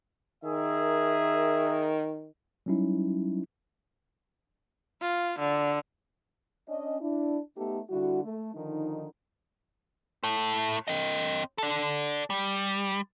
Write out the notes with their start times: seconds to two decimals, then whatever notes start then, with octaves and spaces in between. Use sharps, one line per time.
0.44 D#3 G#4 A#4 E5
2.66 F#3 G3 C#4 D#4 E4
5.01 F4
5.39 D3
6.67 C#4 D4 D#5
7.01 D4 E4
7.57 A3 B3 D#4 G4 A4
7.90 D3 G3 E4 F#4
8.24 A3
8.54 D3 D#3 F3 D#4
10.23 A2 A3
10.88 C4 D#5
11.58 A4 D5
12.30 G3